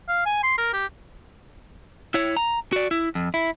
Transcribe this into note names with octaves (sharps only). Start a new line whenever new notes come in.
F5
G#5
C6
A#4
G4
E4 C#5
A#5
F#4 D5
E4
F2
E4